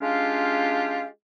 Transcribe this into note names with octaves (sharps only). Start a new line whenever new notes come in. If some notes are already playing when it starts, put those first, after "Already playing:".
G#3 C#4 D4 F4 G4 F5